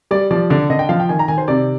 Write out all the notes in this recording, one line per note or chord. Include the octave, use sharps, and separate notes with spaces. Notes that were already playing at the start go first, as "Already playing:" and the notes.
G3 D5
F3 D5
D3 D5
D3 D#5
G5
F3 F5
G5
D#3 G#5
A#5
D#3 G#5
C5
C3 D5